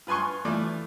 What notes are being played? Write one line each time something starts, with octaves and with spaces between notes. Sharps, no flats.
F4 B4 G#5 C6 C#6
E3 A3 F4 D5